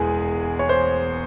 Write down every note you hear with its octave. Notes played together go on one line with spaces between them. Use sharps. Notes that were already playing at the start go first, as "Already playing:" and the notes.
Already playing: E1 E2 E3 G#3 G#4
C#5
C5